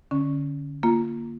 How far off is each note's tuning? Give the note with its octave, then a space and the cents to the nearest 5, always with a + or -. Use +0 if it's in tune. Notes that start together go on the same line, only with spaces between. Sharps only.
D3 +0 C#4 +0
A#3 +0 F4 -10